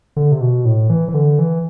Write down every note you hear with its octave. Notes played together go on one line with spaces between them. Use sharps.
D3
C3
B2
A2
E3
E3
D3
E3